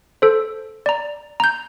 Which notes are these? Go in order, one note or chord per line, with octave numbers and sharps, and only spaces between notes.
A4 C5
D5 A#5
A#5 G6